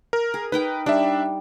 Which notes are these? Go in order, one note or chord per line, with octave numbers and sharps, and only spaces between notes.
A#4
G#4
D#4 A#4 B4 G5
G3 D4 E5